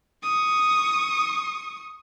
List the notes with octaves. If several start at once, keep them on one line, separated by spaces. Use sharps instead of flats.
C#6 D#6